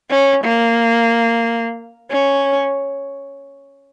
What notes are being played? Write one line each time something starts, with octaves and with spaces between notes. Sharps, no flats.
C#4
A#3
C#4